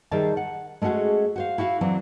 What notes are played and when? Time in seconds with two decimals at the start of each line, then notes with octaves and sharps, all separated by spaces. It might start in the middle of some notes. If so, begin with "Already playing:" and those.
0.11 D#3 G3 G#4 C5 E5 A5
0.37 F#5
0.82 G#3 A3 C#4 F#4 G#4
1.36 F#4 C5 F5
1.58 E4 F#4 E5 F5
1.81 E3 F#3 C4 D4